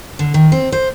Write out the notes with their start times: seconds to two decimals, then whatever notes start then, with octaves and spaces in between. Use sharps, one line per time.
0.19 D3
0.34 D#3
0.52 C4
0.72 C5